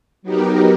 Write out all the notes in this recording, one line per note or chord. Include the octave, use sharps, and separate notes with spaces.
F#3 B3 D#4 G4 A#4